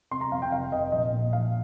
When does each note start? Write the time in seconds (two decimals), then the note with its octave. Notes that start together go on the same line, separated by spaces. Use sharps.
0.11 C3 C6
0.21 A#5
0.31 F2 F5
0.42 G5
0.52 F1 F5
0.72 F1 D#5
0.92 A#1 D#5
1.13 A#2
1.33 A#1 F5